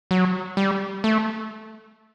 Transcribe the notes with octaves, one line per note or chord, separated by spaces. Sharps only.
F#3
G3
A3